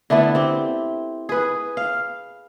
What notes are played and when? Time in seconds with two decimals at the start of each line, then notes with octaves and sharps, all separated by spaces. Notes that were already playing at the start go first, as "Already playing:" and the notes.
0.10 D3 A3 B3 E4
0.35 C4 G4
1.29 G#4 B4
1.77 F5